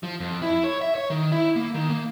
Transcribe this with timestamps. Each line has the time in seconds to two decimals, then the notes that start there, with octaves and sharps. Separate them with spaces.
0.03 F3
0.20 F2
0.42 E4
0.64 C#5
0.81 E5
0.95 C#5
1.10 D#3
1.32 E4
1.56 A#3
1.74 D#3
1.90 A#3